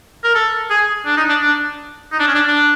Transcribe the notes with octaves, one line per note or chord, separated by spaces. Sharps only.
A#4
A4
G#4
D4
D#4
D4
D4
D#4
D4
C#4
D4
D4